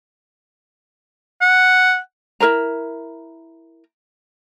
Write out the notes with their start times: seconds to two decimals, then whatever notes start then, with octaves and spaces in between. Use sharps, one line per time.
1.41 F#5
2.40 E4 A#4 C5 A#5